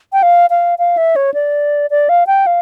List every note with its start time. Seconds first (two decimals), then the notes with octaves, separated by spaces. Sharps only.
0.13 G5
0.23 F5
0.50 F5
0.79 F5
0.97 E5
1.16 C#5
1.34 D5
1.91 D5
2.09 F5
2.27 G5
2.47 F5